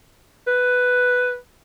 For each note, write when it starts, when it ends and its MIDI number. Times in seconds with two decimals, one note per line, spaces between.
0.47 1.36 71